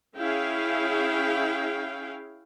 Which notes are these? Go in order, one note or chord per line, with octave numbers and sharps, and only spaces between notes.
C#4 E4 G#4 F5 G5